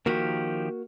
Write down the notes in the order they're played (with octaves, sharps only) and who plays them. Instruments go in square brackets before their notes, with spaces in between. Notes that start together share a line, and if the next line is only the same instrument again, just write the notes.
[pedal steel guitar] D#3 F3 G4 [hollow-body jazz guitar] A#3 F#4